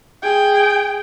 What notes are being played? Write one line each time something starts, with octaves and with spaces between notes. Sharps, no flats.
G#4 G5